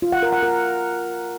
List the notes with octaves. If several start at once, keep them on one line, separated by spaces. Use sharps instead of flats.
F4
F#5
A#4
F#5
A#4